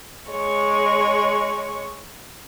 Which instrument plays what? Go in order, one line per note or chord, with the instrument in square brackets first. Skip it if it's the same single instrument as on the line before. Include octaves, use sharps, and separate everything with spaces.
[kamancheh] G#3 C#5